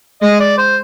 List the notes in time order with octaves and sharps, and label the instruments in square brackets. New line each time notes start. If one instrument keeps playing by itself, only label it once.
[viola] G#3 [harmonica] D#5
[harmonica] D5
C5